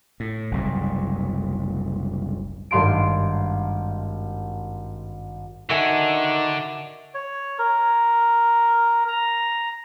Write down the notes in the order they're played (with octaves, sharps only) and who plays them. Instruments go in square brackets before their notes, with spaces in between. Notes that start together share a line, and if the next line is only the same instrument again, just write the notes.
[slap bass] A2
F#1 C2 G#2
[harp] G#1 G2 F5 C6 D7
[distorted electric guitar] D3 D4 [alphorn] D#3 [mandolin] F#4 E5 G#5
[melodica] C#5
A#4
A#5